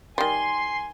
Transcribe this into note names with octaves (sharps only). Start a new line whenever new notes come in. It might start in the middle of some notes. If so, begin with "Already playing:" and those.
D#3 G3 G#5 C6